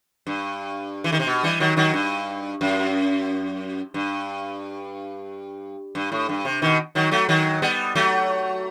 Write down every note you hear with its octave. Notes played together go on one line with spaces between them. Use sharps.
G2
E3
D#3
C3
B2
E3 G3
D#3 F#3
D#3 F#3
G2
F#2
G2
G2
A2
G2
C3
B2 D#3
D#3 F#3
F#3 A3
D#3 F#3
G3 B3
F#3 A3